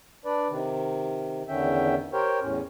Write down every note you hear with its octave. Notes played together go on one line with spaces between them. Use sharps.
D4 B4 D5
C3 D#3
E2 D3 D#3 C#4 E5 G5
G4 A#4 C5 C#5 G5
E2 A2 C#4